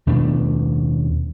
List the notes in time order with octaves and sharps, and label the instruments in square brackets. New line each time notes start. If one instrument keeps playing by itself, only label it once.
[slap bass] D#2 B2 A3 D4